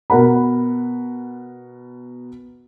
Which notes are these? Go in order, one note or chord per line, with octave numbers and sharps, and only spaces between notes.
B2 A#4 F#5 B5